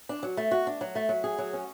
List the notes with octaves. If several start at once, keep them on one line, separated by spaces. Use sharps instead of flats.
D4
F#3
A3
F#4
D4
F#3
A3
F#3
G#4
F#3
C#4